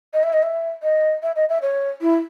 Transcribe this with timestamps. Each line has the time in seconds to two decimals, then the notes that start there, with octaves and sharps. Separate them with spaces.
0.13 D#5
0.23 E5
0.33 D#5
0.43 E5
0.83 D#5
1.23 E5
1.36 D#5
1.49 E5
1.62 C#5
2.01 E4